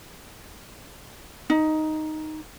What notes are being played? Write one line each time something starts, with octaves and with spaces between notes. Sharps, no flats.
D#4